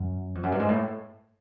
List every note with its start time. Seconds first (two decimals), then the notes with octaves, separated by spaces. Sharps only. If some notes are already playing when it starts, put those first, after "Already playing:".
Already playing: F#2
0.35 F2
0.43 F#2
0.52 G2
0.60 G#2
0.69 A2